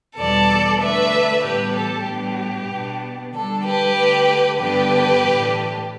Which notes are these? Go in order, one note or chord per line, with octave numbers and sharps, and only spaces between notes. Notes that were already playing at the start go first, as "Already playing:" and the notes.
E2 B2 G3 D4 A4 D5
D3 A3 D4 B4 E5
A2 E3 G3 B3 D4 G4 B4
A4
A2 G3 B3 D4 G4
B2 B3 D4
D3 G3 D4 A4
G4 B4
D3 A3 D4
G2 D3 B3 D4 G4 B4
A2 E3 A3 D4